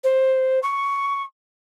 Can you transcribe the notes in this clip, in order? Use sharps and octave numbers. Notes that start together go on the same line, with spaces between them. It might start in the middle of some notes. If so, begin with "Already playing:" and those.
C5
C#6